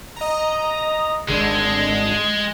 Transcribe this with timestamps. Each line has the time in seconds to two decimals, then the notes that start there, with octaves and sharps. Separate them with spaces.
0.16 D#5 A#5
1.29 G#1 D3 G#3